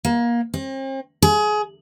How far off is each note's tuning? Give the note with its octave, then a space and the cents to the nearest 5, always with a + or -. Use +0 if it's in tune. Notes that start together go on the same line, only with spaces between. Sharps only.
A#3 +25
C4 +40
G#4 +25